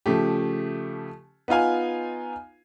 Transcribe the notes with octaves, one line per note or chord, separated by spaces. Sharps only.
C#3 F3 A3 G4
B3 D#4 F4 F5 G#5